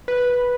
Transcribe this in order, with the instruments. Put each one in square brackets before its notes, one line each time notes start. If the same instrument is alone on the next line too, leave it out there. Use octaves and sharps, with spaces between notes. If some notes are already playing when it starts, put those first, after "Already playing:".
[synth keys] B4